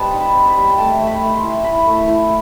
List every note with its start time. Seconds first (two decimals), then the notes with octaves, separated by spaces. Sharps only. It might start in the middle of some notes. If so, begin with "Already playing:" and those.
Already playing: G3 C4 B4 D#5 A5
0.13 D#4
0.20 B5
0.35 C4
0.49 B5
0.56 G3
0.69 G5
0.78 A3 A5
1.00 A3
1.07 B5
1.21 A3
1.36 C6
1.43 E4
1.64 E4 B5
1.86 A3
2.08 E4